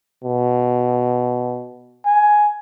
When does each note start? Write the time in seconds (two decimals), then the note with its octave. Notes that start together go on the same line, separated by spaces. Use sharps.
0.24 B2
2.05 G#5